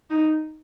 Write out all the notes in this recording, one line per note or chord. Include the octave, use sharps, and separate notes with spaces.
D#4